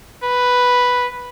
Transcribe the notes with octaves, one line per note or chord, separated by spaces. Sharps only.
B4